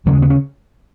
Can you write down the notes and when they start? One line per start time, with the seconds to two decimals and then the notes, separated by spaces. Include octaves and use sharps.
0.06 D#2 C#3 F#3
0.13 G#3
0.22 B3
0.30 C#4